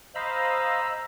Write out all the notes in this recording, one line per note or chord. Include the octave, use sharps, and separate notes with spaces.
C5 D#5 F5 A#5 B5 E6